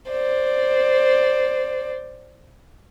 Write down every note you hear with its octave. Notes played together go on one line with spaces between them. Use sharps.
C5 D5